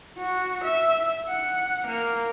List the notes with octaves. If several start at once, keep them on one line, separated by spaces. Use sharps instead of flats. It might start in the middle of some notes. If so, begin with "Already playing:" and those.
F#4
E5
F#5
A#3